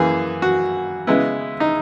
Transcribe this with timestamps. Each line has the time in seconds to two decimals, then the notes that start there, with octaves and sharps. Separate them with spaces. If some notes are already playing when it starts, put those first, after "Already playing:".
Already playing: F#2 E3 A#3 G#4
0.42 F#4
1.07 C#3 G#3 B3 E4
1.60 D#4